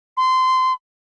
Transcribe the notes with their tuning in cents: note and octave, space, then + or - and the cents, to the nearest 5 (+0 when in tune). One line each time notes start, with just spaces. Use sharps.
C6 -20